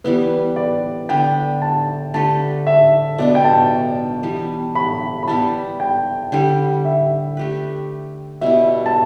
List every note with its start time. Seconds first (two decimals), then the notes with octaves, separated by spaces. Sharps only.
0.04 E3 G3 B3 E4 B4
0.56 D5
1.09 D3 B3 D4 B4 G5
1.62 A5
2.14 D3 A3 G4 B4 A5
2.67 E5
3.18 B2 B3 D4 D5
3.35 G5
3.44 A5
4.23 E3 G3 B3
4.75 B5
5.23 B5
5.27 G3 B3 E4 G4 A5
5.80 G5
6.32 D3 G3 E4 G5
6.85 E5
7.37 A3 G4 B4
8.41 B2 G3 E4 E5
8.86 A5